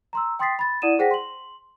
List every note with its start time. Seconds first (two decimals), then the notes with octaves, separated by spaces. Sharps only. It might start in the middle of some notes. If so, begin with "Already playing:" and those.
0.13 A#5 C6 E6
0.39 G5 C6 D#6 A6 B6 C7
0.59 B5 A6
0.82 E4 D5 F#5 D#6 D#7 E7
0.99 G#4 C5 F#5 G5 A#6 B6
1.11 C6 F#7